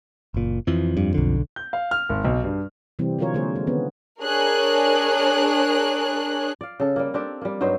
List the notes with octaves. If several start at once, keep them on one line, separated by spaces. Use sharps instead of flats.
F#1 A#2
F2 E3 F3
G2
B1 D3
G6
F5
F6
G#1
B1
G2
C3 E3 G3 C4
D3 F#3 F4 A#4 C#5
D3 G#3 A#3 G#4 C5
G#3
D3 D#3 B3 C#4
D4 G#4 A#4 C#5 F#6
D5 F5
C#3 A4
G3 A#3
C4 D4 G4 A4
G3 A#3
G2 F#3 D#4 C5